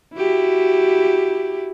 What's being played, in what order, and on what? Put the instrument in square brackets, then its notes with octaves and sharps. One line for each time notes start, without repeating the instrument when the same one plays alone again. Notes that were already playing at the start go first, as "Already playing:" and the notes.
[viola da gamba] E4 F#4 G4